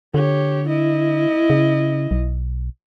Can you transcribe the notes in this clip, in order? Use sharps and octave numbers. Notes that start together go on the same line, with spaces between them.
D3 G4 C#5
E4 D#5
C#3
B1